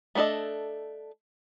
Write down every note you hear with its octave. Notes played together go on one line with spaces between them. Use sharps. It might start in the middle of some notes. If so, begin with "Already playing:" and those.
A3 B3 D4 A4 D#5